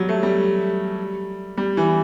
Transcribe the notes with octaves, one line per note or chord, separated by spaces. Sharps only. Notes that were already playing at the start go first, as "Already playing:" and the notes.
Already playing: F#3 G3
A3
G3
G3
E3